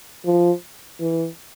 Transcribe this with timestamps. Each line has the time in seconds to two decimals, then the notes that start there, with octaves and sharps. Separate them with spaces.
0.25 F3
1.00 E3